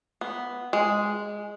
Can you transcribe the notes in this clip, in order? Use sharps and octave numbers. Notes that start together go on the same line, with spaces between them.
B3
G#3